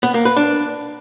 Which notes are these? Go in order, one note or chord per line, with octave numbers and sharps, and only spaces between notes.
B3
A#3
B4
D4